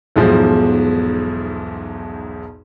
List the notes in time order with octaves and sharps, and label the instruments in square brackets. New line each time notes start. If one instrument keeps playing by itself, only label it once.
[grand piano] B1 E2 G#2 B2 F3